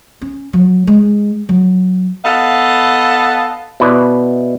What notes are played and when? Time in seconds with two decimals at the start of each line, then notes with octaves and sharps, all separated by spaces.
0.21 C#4
0.53 F#3
0.87 G#3
1.49 F#3
2.25 B3 A4 D#5 F5
3.80 B2 E4 B4 D5